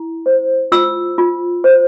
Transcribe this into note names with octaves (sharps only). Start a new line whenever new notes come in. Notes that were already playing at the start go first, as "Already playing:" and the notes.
Already playing: E4
C5
F4 E6
F4
C5